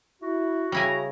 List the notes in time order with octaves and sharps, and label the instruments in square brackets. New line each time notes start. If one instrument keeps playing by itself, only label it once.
[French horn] E4 [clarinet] F#4
[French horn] C#3 [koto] G3 E4 G#5 [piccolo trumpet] A#5